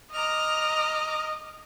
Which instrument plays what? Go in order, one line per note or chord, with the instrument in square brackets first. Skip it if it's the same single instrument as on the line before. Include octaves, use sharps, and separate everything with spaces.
[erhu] D#5 [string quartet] A#5 D6 F6